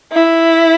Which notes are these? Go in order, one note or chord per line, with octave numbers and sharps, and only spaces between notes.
E4